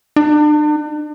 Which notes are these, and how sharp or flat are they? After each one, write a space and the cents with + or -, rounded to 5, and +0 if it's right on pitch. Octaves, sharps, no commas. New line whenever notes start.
D4 +40